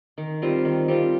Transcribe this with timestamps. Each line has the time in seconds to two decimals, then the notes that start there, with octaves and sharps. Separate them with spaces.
0.18 D#3
0.42 G3 C4 F4
0.65 D#3
0.88 G3 C4 F4